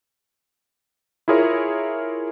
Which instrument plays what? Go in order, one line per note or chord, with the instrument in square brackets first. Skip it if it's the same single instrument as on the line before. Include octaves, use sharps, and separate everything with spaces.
[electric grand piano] E4 F4 G#4 A#4 C#5